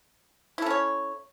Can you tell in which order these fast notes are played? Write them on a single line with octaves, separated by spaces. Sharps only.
E4 A4 C#4 C#5